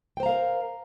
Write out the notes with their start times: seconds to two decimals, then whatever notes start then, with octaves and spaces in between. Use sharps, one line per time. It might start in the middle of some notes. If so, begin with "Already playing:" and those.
0.17 G5
0.20 C5
0.23 A#5
0.26 F5
0.29 A#4